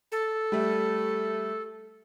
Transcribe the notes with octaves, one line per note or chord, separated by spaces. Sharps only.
A4
G3 A3